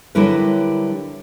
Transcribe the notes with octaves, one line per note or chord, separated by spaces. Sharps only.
D3 F#3 G3 E4 A#4 B4